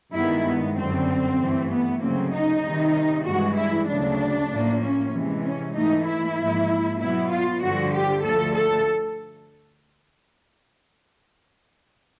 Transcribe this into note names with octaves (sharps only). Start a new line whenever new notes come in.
G2 D#3 G#3 B3 E4
B3
F#2 D3 G3 C4
G2 E3 A3
B3
D2 C#3 F#3 A#3 C4
D#4
C3 D#3 G3
G2 E3 G#3 F#4
E4
D2 C#3 F#3 D4
A2 F3 A#3
C#4
C3 E3 G#3
C#4
G#2 E3 A3 D#4
E4
G#2 F3 A#3
B2 F#3 B3 E4
F4
G2 D3 F3 F#4
G4
D2 D3 F3 A3 A4
A4